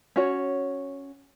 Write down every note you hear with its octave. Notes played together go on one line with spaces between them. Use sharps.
C#4 F#4 C#5